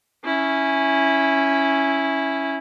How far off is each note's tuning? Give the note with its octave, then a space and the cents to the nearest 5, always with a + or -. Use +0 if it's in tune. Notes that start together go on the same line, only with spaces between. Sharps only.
C#4 +0 E4 -10